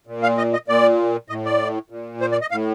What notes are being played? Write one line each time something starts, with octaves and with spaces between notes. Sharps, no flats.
A#2
F5
D#5
D#5
A#2 D5
A2 D#5
D5
A#2
C5
D5
D#5
A2 F5